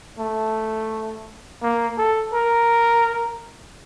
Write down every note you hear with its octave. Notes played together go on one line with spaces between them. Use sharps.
A3
A#3
A4
A#4